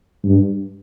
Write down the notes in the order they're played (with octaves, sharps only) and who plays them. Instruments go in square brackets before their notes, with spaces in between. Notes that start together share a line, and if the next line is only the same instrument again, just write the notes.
[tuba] G2